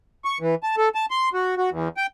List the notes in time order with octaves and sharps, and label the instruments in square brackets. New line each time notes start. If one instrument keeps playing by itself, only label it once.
[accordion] C#6
E3
A5
A4
A5
C6
F#4
F#4
E2
G5